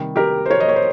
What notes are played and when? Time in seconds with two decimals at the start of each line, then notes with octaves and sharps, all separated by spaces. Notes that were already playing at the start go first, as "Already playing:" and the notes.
Already playing: C3 D#3 G3
0.16 G4 A#4
0.46 C5
0.50 A#4 C#5
0.60 D#5
0.69 C#5
0.76 C5